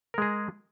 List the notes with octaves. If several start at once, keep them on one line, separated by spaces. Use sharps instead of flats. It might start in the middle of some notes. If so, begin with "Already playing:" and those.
G#3 G#4 A#4